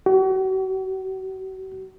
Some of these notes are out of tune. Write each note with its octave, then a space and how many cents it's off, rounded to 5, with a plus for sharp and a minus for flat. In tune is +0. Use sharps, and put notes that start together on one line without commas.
F#4 +40